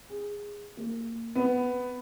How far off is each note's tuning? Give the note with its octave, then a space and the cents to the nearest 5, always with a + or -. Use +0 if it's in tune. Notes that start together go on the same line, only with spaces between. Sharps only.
G#4 -15
A#3 -25
B3 +10